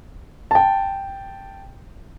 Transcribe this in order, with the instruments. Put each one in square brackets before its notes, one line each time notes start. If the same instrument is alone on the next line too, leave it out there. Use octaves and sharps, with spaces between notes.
[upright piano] G5 A5